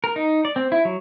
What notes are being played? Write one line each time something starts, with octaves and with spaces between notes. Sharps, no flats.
A#4
D#4
D5
C4
E4
F#3